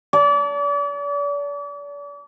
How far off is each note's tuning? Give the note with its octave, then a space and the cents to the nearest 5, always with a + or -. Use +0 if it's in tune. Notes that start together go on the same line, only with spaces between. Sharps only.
D5 -40 A5 +0